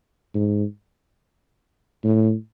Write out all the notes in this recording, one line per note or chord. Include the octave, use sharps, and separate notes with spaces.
G#2
A2